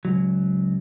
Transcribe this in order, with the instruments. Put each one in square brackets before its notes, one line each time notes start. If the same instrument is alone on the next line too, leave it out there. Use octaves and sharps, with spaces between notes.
[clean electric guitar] C#2 F#3